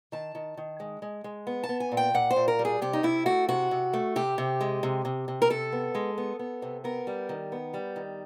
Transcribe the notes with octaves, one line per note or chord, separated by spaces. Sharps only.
D#3 A5
D#3
D#3
G#3
G#3
G#3
B3
A5
B3
G#5
A#2
G5
A#2 F#5
C5
A#2
A#4
G3
G#4
C3 G4
D#4
C3 E4
A3 F#4
C3 F#4
C3
A3
C3 G4
C3
G#3
C3
C3
C3
A#4
C3 A4
B3
G#3
B3
B3
C3
B3 A#4
G3
D#3
B3
G3
D#3